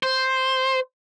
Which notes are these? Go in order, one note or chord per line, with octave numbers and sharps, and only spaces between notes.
C5